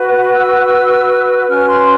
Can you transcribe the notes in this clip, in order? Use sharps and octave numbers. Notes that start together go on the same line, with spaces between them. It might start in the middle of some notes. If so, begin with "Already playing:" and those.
Already playing: F#4 B4
E6
C#4 F#4 B4 F6
C6